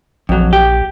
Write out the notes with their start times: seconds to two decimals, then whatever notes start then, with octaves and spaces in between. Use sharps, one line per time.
0.29 A#1 F2 F#3
0.53 G4